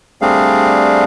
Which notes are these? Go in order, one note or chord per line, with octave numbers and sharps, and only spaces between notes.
G3 A3 C4 D4 G#4 F5